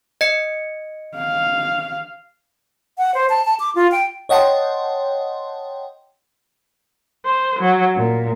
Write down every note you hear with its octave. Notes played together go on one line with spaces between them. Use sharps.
D#5 C#7
F5
F#5
C5
A5
A5
D6
F4
G5
C#5 D#5 F#5 G5 A5 C6
C5
F#3
A#2